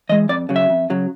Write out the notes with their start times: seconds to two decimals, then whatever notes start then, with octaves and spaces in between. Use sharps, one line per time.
0.09 E3 G#3 D#5
0.29 F2 D5
0.49 C#3 F#3
0.56 E5
0.69 F2
0.90 C#3 F#3